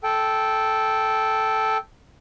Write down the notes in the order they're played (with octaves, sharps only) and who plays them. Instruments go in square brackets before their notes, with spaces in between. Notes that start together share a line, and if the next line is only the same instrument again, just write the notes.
[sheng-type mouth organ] A4 G5